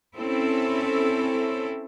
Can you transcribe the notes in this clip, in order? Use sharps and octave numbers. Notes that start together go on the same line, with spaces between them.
C4 C#4 E4 A4